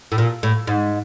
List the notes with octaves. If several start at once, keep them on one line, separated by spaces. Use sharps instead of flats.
A2
A#2
A2
G#2